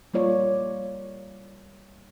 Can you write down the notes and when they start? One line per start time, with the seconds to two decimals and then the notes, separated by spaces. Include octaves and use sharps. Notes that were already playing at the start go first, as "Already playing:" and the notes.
0.14 G3 A#3 F4 C#5 D5